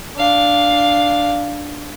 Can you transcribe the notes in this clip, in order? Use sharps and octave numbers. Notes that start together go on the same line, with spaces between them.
D4 F5